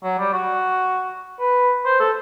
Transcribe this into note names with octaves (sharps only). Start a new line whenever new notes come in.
F#3
G3
F#4
B4
C5
A4